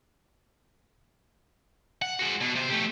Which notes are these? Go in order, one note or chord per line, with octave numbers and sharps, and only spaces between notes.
F#5
G#3 F#4
B2
C3 C5
A3 G4